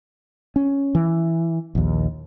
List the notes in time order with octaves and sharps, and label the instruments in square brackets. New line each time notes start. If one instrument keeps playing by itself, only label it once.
[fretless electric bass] C#4
E3
A#1 D#2